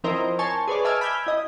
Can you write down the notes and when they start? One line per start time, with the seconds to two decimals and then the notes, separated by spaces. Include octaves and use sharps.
0.04 F3 C4 E4 A#4 C5 D#5
0.39 A#4 C5 C#5 G#5 A5 C#6
0.68 G#4 B4 C#5 D5
0.84 D#5 E5 G#5 A5 D6 F6
1.01 B5 D6 E6 F6 G6 G#6
1.27 E4 D#5